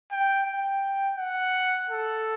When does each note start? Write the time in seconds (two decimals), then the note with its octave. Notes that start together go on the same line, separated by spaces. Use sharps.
0.11 G5
0.46 G5
1.18 F#5
1.90 A4